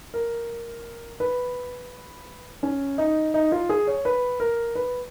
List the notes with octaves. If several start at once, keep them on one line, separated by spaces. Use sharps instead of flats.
A#4
B4
C#4
D#4
D#4
F4
G#4
C#5
B4
A#4
B4